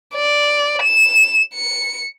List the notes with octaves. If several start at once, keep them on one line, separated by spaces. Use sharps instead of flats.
D5
E7
C#7